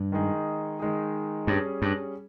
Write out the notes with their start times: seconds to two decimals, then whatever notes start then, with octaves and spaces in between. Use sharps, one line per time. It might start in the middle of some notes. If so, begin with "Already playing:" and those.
Already playing: G2
0.12 D#3 G#3 D#4 G#4
0.80 D#3 G#3 D#4 G#4
1.47 G2 G3 C#4 G#4
1.82 G2